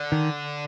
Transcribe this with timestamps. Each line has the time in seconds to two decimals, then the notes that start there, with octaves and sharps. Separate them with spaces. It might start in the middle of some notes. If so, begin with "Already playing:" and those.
Already playing: D3
0.12 D#3